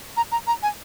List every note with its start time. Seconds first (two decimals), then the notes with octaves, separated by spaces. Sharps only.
0.17 A#5
0.32 A#5
0.47 A#5
0.63 G#5